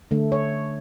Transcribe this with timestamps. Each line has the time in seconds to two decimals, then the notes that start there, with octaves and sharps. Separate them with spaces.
0.11 D3 A3
0.32 C#5